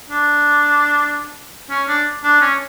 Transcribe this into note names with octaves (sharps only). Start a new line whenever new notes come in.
D4
C#4
D4
D4
C#4